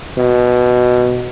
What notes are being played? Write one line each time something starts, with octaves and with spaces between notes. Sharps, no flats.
B2